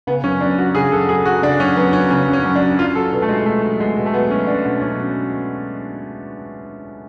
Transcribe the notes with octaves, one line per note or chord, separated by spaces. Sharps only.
C#3 B3
F#2 C#4
F#2 D4
F#3 F#4
C#3 G#4
F#2 A4
F#2 G#4
F#3 F#4
C#3 D4
F#2 C#4
F#2 B3
F#3 C#4
C#3 C#4
F#2
C#4
F#2
D4
F#3
F#3 F4
F#3 A4
B2 B3
A3
B2 G#3
F#3 A3
F#3
B2 G#3
B2
A3
F#3 B3
F#3 C#4
B2 D4
B2
F#3 C#4